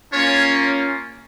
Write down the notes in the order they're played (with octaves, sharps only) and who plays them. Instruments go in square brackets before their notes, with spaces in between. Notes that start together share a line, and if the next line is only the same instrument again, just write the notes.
[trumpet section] A#3 C#4 F4 C#5